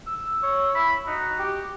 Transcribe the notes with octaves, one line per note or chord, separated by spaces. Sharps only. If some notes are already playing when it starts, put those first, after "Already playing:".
E6
C#5
E4 B5
D#4 F#4
G4